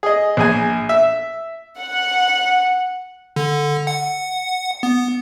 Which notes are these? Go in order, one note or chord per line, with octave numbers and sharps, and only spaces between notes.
G#4 D#5
A#1 G#4 G#5
E5
F#5
D3
F#5
B3